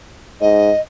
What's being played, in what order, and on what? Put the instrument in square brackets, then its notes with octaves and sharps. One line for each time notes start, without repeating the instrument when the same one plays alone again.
[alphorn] G#2 [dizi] D#5